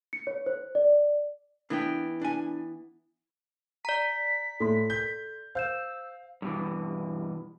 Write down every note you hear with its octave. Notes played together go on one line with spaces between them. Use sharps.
C#7
C#5
C5
D5
E3 B3 D4 G5
D4 G#5
D5 A#5 B6
A2 A4 C6
G6
C5 F5 E6 G6 E7
G2 B2 E3